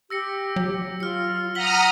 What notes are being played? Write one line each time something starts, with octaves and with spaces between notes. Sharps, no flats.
G4 E6 A#6 C#7
F#3
F4 F6 C#7
F#5 A#5 D#6 F6 B6 F#7 G7